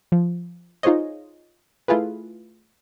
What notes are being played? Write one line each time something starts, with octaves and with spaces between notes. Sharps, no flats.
F3
D#4 F4 G#4 C5 C#5 D#5
A3 E4 F4 G#4 B4